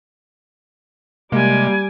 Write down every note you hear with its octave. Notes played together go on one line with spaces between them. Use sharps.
C3 G3 G#3 A#3 G#5 D6